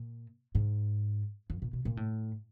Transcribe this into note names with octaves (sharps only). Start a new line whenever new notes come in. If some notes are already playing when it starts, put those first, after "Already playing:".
Already playing: A#2
G#2
F2
A#2
B2
A#2
A2